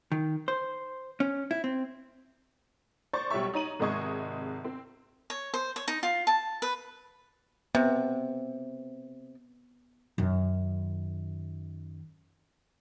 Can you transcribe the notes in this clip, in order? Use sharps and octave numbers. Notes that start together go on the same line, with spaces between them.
D#3
C5
C#4
E4
C4
C5 D5 C#6 A6
B1 G3 G4 C#5 E5 C#6
D#4 C#5 A#5 D#7 F#7
G#1 C3 G#3 D#5 C#6 G#6
C4
C#5
C5
C#5
D#4
F4
A5
B4
C3 B3
F#2 D#3